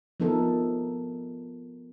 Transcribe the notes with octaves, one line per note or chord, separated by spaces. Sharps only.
F3 B3 D#4 A4 A#4